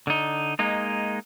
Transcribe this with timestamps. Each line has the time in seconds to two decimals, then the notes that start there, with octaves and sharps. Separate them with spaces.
0.07 D3 D#4
0.59 G#3 A#3 D#4